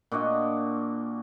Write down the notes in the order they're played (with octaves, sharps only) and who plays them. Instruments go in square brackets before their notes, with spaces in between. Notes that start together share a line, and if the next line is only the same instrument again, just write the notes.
[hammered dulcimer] A#2 D4 F#4 D#5